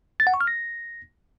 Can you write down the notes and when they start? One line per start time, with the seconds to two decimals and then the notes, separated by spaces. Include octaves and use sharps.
0.20 A6
0.27 F#5
0.34 C#6
0.41 F6
0.47 A#6